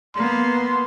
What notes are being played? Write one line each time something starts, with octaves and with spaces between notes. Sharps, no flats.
A#3 B3 C6